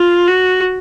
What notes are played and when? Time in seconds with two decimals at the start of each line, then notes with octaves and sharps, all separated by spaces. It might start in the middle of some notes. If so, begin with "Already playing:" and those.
Already playing: F4
0.27 F#4